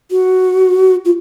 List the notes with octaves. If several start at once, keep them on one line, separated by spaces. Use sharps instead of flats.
F#4
F4